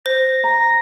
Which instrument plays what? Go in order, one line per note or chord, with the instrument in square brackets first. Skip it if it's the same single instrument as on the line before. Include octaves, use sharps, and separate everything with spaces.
[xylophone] C5 [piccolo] A#6
[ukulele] A#5 [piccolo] A#6